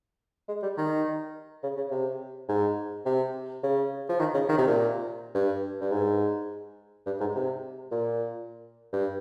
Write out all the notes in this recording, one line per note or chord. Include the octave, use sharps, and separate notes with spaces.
G#3
G3
D#3
C#3
C#3
C3
G#2
C3
C#3
F3
D#3
C#3
D#3
C3
A#2
G2
G2
G#2
G2
G#2
C3
A#2
G2